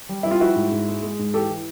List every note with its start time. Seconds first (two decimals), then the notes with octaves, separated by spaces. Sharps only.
0.09 G3
0.23 G3 E4
0.31 F4
0.40 F3 E4 F#4
0.56 G#2
0.71 G#2
0.88 G#3
1.03 G#3
1.19 G#2
1.34 E3 G4 A4
1.50 E3